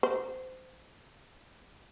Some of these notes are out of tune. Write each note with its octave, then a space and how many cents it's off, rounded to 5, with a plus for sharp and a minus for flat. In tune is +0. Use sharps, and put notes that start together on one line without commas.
C5 -20